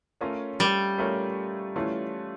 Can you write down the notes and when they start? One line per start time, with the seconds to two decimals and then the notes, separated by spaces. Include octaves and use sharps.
0.21 A3 C#4 F4 A#4 C#5
0.60 G3
0.98 A3 C#4 F4 A#4 C#5
1.76 E3 A3 C#4 F4